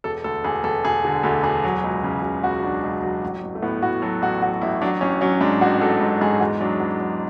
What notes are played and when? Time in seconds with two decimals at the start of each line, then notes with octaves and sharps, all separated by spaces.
0.04 E1 A4
0.24 D2 A4
0.44 E1 G#4
0.64 E1 A4
0.85 E1 G#4
1.05 D3
1.23 D2 A4
1.43 E1 G#4
1.64 F#3
1.84 C#2
2.04 C#3
2.23 C#3
2.43 C#2 F#4
2.63 F#3 D4
2.83 C#2
3.02 F#3
3.23 A1
3.43 A1
3.55 A3
3.62 A2 B3
3.82 A2 F#4
4.02 F#3 A4
4.22 A1 F#4
4.42 F#3 F#4
4.62 A1 E4
4.81 F#3 D4
5.01 A1 C#4
5.21 F#3 C#4
5.41 G#2 D4
5.61 A1 F#4
5.80 F#3 A4
6.01 G#2
6.21 G#2 G#4
6.40 E2 F#4
6.61 F#3 D4
6.80 E2 B3
7.00 F#3